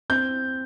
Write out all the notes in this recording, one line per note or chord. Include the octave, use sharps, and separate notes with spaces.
C4 G6